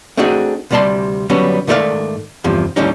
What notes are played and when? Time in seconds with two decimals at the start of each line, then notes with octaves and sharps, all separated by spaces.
0.17 A3 C4 D4 D#4 F#4 G#4
0.71 D2 C3 G3 D5 A5 C6
1.29 D3 F#3 G3 B3 C#4
1.67 G#2 D#3 A3 G4 D5 F5
2.44 E2 G2 C3 F3
2.76 D#2 A2 D3 G3 C#4 D#4